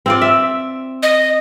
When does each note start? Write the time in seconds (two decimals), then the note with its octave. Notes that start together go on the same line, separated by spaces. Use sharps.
0.06 C4 F4 D5
0.21 E5
1.03 D#5